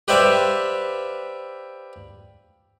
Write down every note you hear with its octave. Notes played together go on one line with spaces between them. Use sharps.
G4 B4 C5 D5 E5 F5